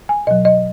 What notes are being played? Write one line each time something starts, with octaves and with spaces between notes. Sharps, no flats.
G#5
B2 F#3 D#5
D#5